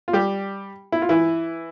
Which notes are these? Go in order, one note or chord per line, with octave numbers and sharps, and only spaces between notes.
F4
G3 G4
E4
F4
E3 E4